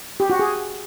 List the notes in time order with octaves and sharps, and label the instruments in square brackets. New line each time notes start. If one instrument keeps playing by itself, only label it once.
[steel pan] G4
F#4
G#4